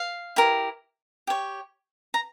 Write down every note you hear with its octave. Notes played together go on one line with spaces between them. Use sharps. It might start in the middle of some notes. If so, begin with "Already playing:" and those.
Already playing: F5
E4 G4 A#4
G4 C#5
A#5